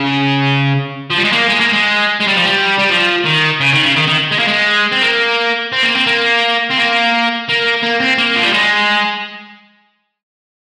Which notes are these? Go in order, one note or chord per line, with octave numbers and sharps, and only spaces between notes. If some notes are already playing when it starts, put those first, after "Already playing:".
Already playing: C#3
F3
G3
G#3
A#3
G#3
A#3
G#3
G#3
G3
F3
G3
G3
F3
D#3
C#3
D#3
C#3
D#3
D#3
G#3
A#3
G#3
C4
A#3
C4
A#3
C4
A#3
C4
A#3
A#3
A#3
C4
A#3
F3
G3
G#3